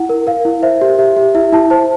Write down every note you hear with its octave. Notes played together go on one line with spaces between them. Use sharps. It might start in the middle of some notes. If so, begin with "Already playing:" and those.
Already playing: E4 F#5
A#4
A#4 F5
E4
C5 E5
G4
G4 E5
G4
E4 E5
E4 A5
C5 A5